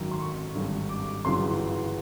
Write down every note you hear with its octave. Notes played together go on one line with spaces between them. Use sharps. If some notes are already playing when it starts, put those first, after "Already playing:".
Already playing: G#1 F#2 D#3 A#5
C6
C#6
G#1 G2 D3
D6
G1 F#2 C#3 E3 C6